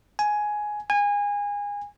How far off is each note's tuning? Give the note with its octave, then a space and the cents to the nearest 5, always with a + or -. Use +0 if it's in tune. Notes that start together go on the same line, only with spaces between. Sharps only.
G#5 +10
G#5 -25